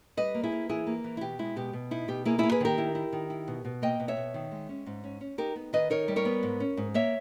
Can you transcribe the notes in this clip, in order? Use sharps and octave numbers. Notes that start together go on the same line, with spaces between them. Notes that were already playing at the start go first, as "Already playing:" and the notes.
G3 B4 D#5
A#3
E4 G#4
A#3
E3 E4 G#4
A#3
E3
E4
B2 G4
G#3 E4
B2 G4
B2
D#4 E4
B2 G4
A#3 E4 G#4
A#3 E4 G#4
G#4 B4
D#3 G4 A#4
E4
E4
D#3
E4
B2
B2
A#3 D#5 G5
B2
C#5 E5
B2
D#3
G#3
C#4
G#2
C#4
C#4
D#4 G4 A#4
B3
D#3 B4 D#5
D#4 A#4 C#5
G3
A#4 C#5
B3
G#2
C#4
G#2
A#3 C#5 E5